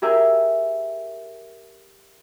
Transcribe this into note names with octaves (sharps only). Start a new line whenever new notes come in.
G4 G#4 A#4 E5